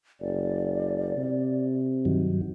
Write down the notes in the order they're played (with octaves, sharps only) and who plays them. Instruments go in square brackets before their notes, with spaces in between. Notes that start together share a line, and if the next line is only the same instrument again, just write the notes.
[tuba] F#1 [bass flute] D5
[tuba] C3
[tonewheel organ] G2 D#3 F#3